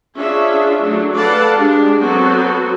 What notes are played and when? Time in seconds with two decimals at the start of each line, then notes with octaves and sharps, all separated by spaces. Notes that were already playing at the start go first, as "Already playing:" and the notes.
0.16 C#4 D4 F4 G#4 E5
0.82 F#3 A3 D4
1.16 A4 B4 D5 F5 F#5 A5
1.56 G#3 D4 G4
2.00 F#3 B3 C4 F#4 A4